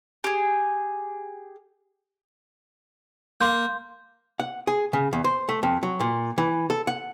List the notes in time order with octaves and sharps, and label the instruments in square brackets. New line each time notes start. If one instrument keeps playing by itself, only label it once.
[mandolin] G4 G#4
[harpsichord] A#3 [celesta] C6 G6
[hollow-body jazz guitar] F#5
G#4
C#3
E2
C5
A3
F2
F#3
A#2
E3
A4
F#5